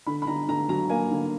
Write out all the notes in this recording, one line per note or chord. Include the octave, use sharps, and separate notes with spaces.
D3 B5
B5
D3 A#5
D3 A#5
F#3 A#5
A#3 G#5
D3